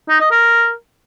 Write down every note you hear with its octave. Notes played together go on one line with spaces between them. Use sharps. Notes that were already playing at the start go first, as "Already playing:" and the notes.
D#4
D#5
A#4